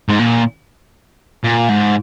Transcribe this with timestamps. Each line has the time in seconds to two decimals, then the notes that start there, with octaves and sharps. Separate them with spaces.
0.09 G#2
0.19 A#2
1.44 A#2
1.69 G#2